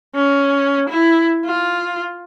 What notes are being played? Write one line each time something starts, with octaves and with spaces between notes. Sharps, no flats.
C#4
E4
F4